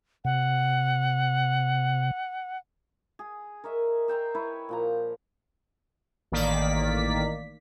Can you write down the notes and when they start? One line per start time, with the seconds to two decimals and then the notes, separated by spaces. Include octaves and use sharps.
0.25 C3 F#5
3.19 G#4
3.64 A#4 C#5 D#5 E5
4.08 E5 G5 A#5 C6
4.35 E4 B4 C#5
4.69 A#2 F3 A#5
6.32 A1 D#3 A#3 D5 B6